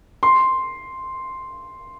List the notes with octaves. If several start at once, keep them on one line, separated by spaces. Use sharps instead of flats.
C6